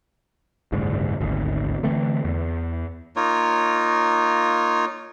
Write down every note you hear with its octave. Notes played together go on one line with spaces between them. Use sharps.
F#1 C2 G#2 D3
D#1 G#1 D2
D3 E3 A3 C4
E2
A#3 D#4 F4 C#5